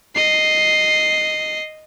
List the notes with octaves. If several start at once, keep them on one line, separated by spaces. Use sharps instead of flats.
D#5 C7